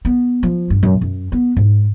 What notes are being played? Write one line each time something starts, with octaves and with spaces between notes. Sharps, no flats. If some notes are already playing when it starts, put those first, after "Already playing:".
B3
F3
G2
F#2
F#2
B3
G#2